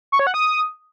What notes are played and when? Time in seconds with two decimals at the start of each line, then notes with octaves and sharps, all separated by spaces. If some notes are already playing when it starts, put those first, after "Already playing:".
0.12 C#6
0.19 C#5
0.27 F#5
0.34 D#6